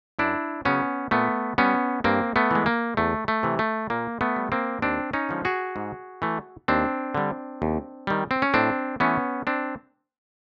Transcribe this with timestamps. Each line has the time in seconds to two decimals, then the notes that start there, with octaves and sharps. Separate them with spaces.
0.19 F#2 D4 E4
0.65 C#3 F#3 B3 C#4
1.11 A#2 A3 B3
1.58 G3 B3 C#4
2.04 G2 A#3 C4
2.36 A3 B3
2.51 E3 G#3
2.66 A#3
2.97 E2 A3
3.28 A3
3.43 C3 E3
3.59 A3
3.90 A#2 A#3
4.21 A3 B3
4.36 G3
4.52 A#3 C4
4.82 D#2 C4 D4
5.13 C#4 D#4
5.29 D3 F3 G#3
5.45 F#4 G#4
5.76 G#2
6.22 E3 A3
6.68 D#2 C4 D4
7.15 D3 G3
7.62 D#2
8.07 D#3 G3
8.31 C4
8.42 C#4
8.54 A2 C4 D4
9.00 E3 A3 B3 C#4
9.47 C4 D4